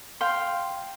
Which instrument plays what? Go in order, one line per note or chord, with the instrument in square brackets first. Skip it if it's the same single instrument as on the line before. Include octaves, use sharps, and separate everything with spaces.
[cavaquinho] F5 G5 C6